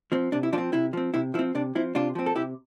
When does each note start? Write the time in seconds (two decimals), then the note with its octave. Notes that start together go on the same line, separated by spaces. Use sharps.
0.12 F3 C4
0.32 C3 D4
0.43 E4
0.53 F3 D4 F4
0.58 C4
0.73 C3 E4
0.93 F3 C4
1.14 C3 E4
1.34 F3 E4
1.39 C4
1.55 C3 D4
1.75 F3 C4 E4
1.95 C3 D4 F4
2.15 F3 C4
2.26 A4
2.36 C3 E4 G4